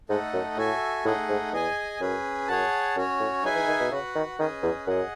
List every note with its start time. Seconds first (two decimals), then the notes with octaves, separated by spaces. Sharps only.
0.09 G#2 A3 D#4 A4 D#5 F#5
0.33 F#2
0.57 A2 F#4 A4 E5 G#5
1.05 A2 A3 D#4 G#4 D#5 F#5
1.29 G#2
1.53 E2 G#4 D#5 G#5
2.00 F#2 C#4 G#4 B4
2.48 F#2 G#4 C#5 F#5 A5
2.96 F#2 C#4 F#4 C#5
3.20 A2
3.43 F#3 D#4 G#4 B4 E5 G#5
3.55 E3
3.67 D#3
3.80 B2
3.91 C#3 F#4 B4 F#5
4.15 D#3
4.39 D#3 C#4 G#4 B4 D#5
4.63 E2
4.87 F#2 G#4 D#5 F#5